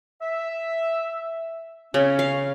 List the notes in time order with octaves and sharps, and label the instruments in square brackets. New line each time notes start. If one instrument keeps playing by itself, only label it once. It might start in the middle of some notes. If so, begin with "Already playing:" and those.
[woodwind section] E5
[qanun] C#3 [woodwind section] C#4
[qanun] F5